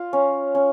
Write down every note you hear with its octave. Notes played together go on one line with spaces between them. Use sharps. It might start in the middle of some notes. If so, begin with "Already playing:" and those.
Already playing: F4
C#4
C#4